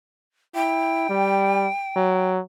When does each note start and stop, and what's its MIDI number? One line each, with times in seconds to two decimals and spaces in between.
0.55 1.08 64
0.55 2.31 79
1.09 1.68 55
1.96 2.40 54